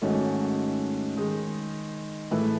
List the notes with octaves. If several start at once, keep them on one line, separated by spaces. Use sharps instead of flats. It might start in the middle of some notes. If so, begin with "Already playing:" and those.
G#2 D#3 A3 C#4 F#4
D#3 G#3 D#4
A2 E3 A3 E4 B4